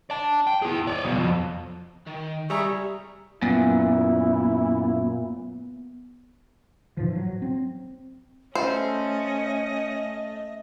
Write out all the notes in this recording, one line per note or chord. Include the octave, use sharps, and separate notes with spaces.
D5 A5
G5
E4 G#4
C#5 D5
B1 B2
F2
D#3
C2 G3 G#4 E5 A#5 C#6
F#2 A#2 B3 E4
G#2 E3 F3
F#3
C4
A3 C#4 C5 D#5